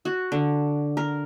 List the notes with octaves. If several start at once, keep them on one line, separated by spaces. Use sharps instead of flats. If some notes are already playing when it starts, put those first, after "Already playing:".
F#4
D3
A#4